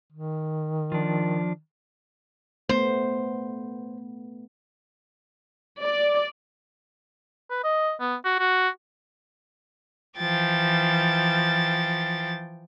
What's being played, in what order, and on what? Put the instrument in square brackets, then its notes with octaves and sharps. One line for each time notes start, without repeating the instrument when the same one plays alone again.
[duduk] D#3
[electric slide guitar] F3 D4
[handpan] A3 B3 [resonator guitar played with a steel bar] C5
[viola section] D5
[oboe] B4
D#5
B3
F#4
F#4
[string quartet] E3 F3 G5 A6